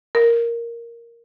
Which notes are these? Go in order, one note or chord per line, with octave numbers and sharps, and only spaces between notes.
A#4